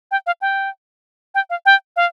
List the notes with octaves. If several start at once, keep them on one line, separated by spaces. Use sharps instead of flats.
G5
F5
G5
G5
F5
G5
F5